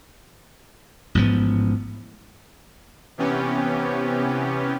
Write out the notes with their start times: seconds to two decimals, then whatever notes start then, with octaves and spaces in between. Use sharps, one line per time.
1.15 A1 G#2 F3 B3
3.18 C3 E3 B3 C#4 G4